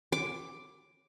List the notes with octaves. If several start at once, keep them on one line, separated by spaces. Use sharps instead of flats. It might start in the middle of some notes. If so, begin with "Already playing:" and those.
D6